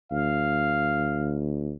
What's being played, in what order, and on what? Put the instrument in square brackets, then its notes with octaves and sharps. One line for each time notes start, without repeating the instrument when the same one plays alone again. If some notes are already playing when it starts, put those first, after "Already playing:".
[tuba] D2 [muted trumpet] F5